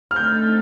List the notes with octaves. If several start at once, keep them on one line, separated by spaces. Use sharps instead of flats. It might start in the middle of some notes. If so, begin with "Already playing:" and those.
F6
D3 A3 C4 D#4 A4 G6